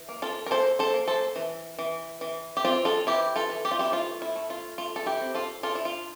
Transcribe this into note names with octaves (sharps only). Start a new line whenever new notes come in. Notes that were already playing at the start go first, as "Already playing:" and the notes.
Already playing: E3
A#3
F4 A4
A#4
A#3 A4 C5
A4 C5
A#3
A4 C5
E3
E3
E3
G4
C4 F4
F4 A4
E3 E4 G4
F4 A4
E3
G4
F4
E4 G4
A3 F4
E4
A3
F4
A3 F4
A4
E4 G4
C4
F4 A4
D4 F4 A4
E4
F4